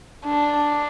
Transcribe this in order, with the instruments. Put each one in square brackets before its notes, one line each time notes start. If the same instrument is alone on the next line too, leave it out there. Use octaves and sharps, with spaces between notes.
[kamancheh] D4